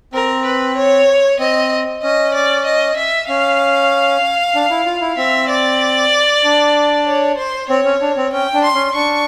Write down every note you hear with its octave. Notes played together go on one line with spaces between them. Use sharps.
C4 A#4
B4
C#5
C4 D#5
C#4 D#5
D5
D#5
E5
C#4 F5
D4
E4
F4
E4
C4 E5
D5
D4
C#5
C5
C4 C#5
C#4
D4
C4
C#4 G5
D4
C6
C#4
D4 C#6